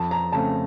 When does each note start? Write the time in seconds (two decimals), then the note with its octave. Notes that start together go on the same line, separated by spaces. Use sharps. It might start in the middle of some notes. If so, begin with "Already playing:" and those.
Already playing: F2 A5
0.11 A#5
0.32 C#3 A3 C4 A5